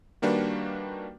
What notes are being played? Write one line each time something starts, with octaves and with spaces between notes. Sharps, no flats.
D#3 G3 A#3 D4 F#4 B4